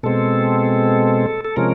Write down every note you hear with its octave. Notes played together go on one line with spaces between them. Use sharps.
B2 G#3 C4 A4
A4
C3 F3 G#3 C#4 A#4